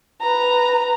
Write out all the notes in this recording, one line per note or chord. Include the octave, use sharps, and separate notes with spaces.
B4 A#5